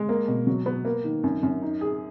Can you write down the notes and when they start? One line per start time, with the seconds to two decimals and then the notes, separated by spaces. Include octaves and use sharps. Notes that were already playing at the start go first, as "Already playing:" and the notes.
Already playing: G#3
0.09 A#3
0.28 B2
0.47 F#3
0.66 B3
0.85 A#3
1.04 D#3
1.24 F#2
1.43 F#2
1.62 D#4
1.81 G#4